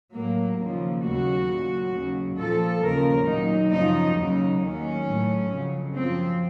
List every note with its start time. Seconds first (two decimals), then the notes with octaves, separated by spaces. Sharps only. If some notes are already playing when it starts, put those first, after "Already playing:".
0.13 A2 F#3 A#3
0.58 D#2 C#3 F3 A#3
1.02 D#2 C#3 F#3 F#4
1.47 A#2 F#3
1.92 D#2 C#3 F#3
2.37 A#2 F3 A4
2.81 D#2 C#3 F3 A#4
3.26 A#2 F#3 D#4
3.71 F#2 C#3 F3 D#4
4.16 D#2 C#3 F#3 D#4
4.60 D#2 D#3 F#3 C#4
5.05 A2 F#3
5.50 F2 C#3 F#3
5.94 F#2 F3 C4